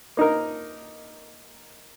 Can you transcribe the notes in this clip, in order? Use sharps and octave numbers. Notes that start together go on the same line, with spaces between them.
A#3 D#4 A#4